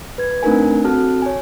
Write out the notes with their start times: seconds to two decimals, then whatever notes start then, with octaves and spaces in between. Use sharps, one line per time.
0.18 B4 G#6
0.43 A3 C4 D4 D#4 A#4 G#5
0.84 C4 F#4 A4 A5 F6
1.22 C#5 G#5